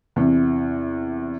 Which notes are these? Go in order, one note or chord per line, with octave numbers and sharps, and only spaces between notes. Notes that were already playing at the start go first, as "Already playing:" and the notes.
E2 C3